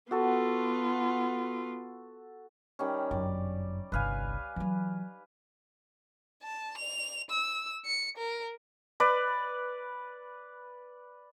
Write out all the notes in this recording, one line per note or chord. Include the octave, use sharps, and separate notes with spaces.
B3 F4 F#4 A4
D#3 G3 C#4
G1 F#2 D5
G1 C2 B4 F5 G#5
E3 F#3
A5
F7
E6
C#7
A#4
B4 D5